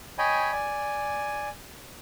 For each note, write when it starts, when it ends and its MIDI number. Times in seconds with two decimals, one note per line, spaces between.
0.18 0.52 73
0.18 0.52 75
0.18 0.52 79
0.18 0.52 80
0.18 0.52 83
0.52 1.49 74
0.52 1.49 80